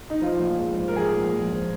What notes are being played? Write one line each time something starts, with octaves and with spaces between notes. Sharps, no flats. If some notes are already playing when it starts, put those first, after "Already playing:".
D#4
F3 F4
A#1
G#2
F3
A#4
F3 G#4
A#1
A#1
F3